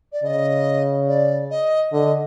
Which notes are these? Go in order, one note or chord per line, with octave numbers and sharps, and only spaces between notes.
D5
C#3 D#5
D5
D#5
D3 D#5